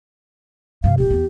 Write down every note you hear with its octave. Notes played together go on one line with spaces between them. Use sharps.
G2 C3 F5
D#1 A#2 G4
E2 B3